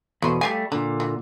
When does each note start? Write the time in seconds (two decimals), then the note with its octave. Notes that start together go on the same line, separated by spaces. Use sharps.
0.22 E2 B2 A3 C5
0.41 G3 A3 G4 F5 G#5
0.72 A#2 D3 D4
1.00 E3